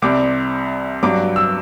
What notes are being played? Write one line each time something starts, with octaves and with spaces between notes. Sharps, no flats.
C2 C3 G3 D6
G2 F#3 D6
E6